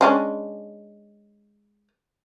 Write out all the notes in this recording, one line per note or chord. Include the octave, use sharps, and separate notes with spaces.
G#3 C#4 D4